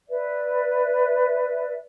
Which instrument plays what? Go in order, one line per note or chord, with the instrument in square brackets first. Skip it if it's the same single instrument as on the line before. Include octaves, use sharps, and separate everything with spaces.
[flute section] B4 D5 E5